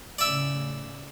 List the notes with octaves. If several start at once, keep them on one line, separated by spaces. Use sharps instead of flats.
A2 C#3 D5 E5